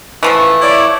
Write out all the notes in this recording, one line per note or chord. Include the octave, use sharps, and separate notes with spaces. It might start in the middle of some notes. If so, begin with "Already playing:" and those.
E3 F3 A3
E4 C#5 D5